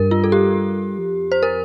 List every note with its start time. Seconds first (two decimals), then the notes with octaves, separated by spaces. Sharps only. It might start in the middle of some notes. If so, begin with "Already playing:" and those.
Already playing: G2 A#4
0.11 F4
0.24 A4
0.32 G4
0.99 F2
1.32 C5
1.43 A#4